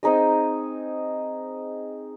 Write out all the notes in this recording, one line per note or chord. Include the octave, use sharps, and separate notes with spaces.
C4 D#4 G#4 D#5